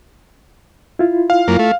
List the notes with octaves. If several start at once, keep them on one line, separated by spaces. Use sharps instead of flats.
E4 F4
F5
F#2 A#3
A3